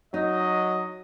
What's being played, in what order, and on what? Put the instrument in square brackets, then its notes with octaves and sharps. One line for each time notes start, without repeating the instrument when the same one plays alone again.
[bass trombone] F#3 [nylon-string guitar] D#4 [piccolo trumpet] D#5